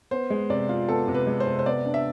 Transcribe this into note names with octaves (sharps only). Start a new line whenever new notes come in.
B3 C5
G#3
C3 D5
F4
B3 A4
C3
B4
G#3
C5
C3
C5
B3 D5
D4
E5